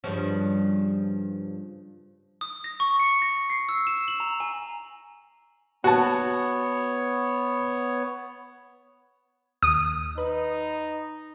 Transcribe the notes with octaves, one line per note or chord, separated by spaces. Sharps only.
G2 C#3 F3
D#6
A#6
C#6
C#7
A#6
C7
E6
E7
F#7
A#5
G#5
B3 F#4 C#5 A5
D#2 D#6
D#4 B4